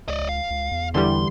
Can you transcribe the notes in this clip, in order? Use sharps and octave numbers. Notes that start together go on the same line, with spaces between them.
C#2 D5 D#5
F5
C#2
E2
D3 E3 G3 C6